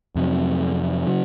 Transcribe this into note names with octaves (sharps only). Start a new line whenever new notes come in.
F2 C3 F#3
C#3 F#3